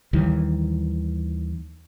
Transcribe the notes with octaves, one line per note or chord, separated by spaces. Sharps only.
D#2 D#3 E3 G3